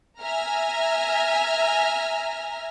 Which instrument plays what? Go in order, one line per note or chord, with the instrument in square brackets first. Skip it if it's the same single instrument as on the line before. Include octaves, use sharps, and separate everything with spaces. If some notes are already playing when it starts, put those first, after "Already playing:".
[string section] E5 G#5 A#5 F6